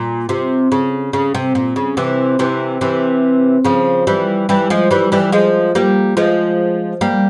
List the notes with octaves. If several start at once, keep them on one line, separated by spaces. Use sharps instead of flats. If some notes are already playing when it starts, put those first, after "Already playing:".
Already playing: A#2
C3
C#3
C#3
C3
A#2
C#3
C3 E3
C3 E3
C3 E3
C#3 F3
E3 G3
E3 G3
F3 G#3
E3 G3
E3 G3
F3 G#3
G3 A#3
F3 G#3
G3 A#3